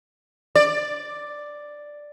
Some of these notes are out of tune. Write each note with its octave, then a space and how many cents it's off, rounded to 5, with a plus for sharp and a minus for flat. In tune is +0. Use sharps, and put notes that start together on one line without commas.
D5 +5